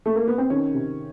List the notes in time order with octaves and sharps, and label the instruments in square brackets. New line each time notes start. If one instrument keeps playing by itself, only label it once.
[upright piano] A3
A#3
B3
C4
D#3 C#4
C3